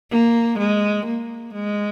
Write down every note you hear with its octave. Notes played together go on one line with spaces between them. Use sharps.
A#3
G#3
A#3
G#3